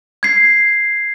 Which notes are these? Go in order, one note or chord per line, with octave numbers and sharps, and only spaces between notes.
G#6 C7